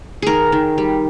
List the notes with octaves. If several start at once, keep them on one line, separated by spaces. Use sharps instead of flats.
D#3 G#4 A#4
D#3
G3